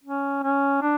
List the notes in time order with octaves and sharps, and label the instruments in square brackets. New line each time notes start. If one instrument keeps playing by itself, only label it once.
[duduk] C#4
C#4
D4